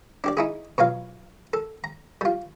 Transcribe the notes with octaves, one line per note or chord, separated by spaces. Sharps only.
D4 G4 D5
D#4 E4 G#4
B2 F#3 F4 F5
A4
A#5
G3 F4